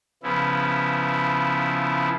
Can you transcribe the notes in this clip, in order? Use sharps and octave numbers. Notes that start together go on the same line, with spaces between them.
C#3 F3 B3 E4